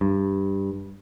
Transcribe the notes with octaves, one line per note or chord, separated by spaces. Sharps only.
G2